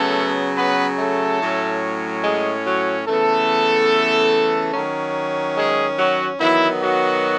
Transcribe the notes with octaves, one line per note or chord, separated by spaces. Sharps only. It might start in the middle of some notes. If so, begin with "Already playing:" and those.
Already playing: C#3 F#3 A3 B3 A4
B3 B4
A3 A4
A2 F#3 C#4
G#3 G#4
F#3 F#4
C#3 E3 A3 B3 A4
D#3 F#3 C#4
G#3 G#4
F#3 F#4
D#3 E3 F#3 B3 E4
F#3 F#4